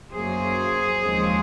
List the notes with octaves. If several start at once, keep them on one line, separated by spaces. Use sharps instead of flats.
F#2 C#3 F#3 A#3 G#4 C5
D#2 C#3 F3 G#3 C4